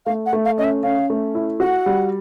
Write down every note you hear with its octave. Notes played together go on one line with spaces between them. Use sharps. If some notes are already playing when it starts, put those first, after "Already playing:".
A3 F5
F#5
A3
F5
C#4 D#5
E5
C#4 F5
A3
E4
F#4 F#5
G3